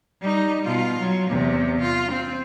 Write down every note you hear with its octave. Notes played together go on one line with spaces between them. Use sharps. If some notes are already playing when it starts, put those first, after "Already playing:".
G3 D#4
B2 F4
F#3
E2 C3
F4
C4